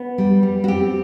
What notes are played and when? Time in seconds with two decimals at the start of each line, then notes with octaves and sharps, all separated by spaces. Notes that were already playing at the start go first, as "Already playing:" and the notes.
Already playing: B3 B4
0.18 G3
0.43 G3
0.64 F#4
0.68 C4 G4